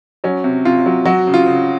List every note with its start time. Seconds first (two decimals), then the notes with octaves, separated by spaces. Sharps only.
0.24 F#3 C#4
0.44 C3
0.65 C3 F4
0.86 F#3
1.05 F#3 F#4
1.27 C#3
1.34 F4
1.46 C#3